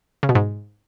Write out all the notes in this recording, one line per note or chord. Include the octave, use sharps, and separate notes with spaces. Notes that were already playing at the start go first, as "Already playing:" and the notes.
C#3
B2
G#2